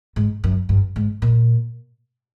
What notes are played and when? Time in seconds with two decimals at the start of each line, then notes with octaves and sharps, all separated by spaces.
0.16 G#2
0.44 F#2
0.69 G2
0.96 G#2
1.22 A#2